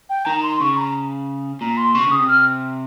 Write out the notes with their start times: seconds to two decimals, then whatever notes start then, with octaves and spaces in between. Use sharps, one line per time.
0.10 G5
0.26 D#3 A#5
0.43 C6
0.60 C#3 C#6
0.77 A#5
1.61 A#2 A#5
1.77 C6
1.95 C3 C#6
2.07 C#3 D#6
2.19 C3
2.28 F6